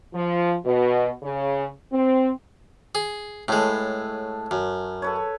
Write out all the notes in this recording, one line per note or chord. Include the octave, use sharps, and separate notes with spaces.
F3
B2
C#3
C4
G#4
A2 G#3 A4 B4 C#5
F#2
A4 B4 C#5